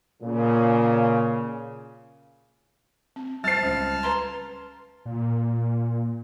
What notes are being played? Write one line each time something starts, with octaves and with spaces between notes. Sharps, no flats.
A#2 C#3
C4
G3 C5 A5 F6 A6 C7
C#2
B4 A#5 C6
A#2